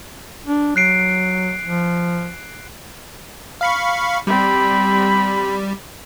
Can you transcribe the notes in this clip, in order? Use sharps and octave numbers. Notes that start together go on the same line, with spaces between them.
D4
F#3 F#6 C7 D7
F3
F5 B5 C#6
G3 C4 B5